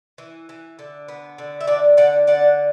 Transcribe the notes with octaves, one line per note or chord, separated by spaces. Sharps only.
E3
E3
D3
B3
D3
E5
D4 D5 F#5
D3 D5 F#5
D3 D5 F#5